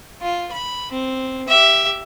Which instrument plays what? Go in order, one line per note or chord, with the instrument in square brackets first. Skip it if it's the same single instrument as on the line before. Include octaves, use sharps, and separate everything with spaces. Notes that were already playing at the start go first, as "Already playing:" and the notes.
[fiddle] F4
B5
C4
G4 E5